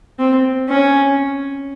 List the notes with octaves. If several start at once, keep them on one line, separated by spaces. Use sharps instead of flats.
C4
C#4